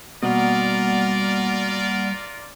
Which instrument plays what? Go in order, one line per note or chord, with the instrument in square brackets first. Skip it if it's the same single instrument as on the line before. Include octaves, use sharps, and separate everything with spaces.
[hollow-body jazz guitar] B2 [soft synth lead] G3 [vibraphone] A#3 F#5 [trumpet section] F4 A#4 D5